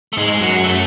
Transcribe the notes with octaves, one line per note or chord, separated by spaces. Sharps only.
A3
G#2 G#3
F#2 F#3
A3